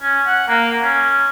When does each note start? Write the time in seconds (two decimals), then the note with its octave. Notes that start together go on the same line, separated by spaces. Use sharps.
0.02 C#4
0.27 F#5
0.49 A#3
0.81 C#4